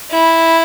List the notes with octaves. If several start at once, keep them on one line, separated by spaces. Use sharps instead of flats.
E4